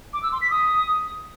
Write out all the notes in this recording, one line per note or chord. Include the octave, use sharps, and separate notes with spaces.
D6
E6
C6
B6
D#6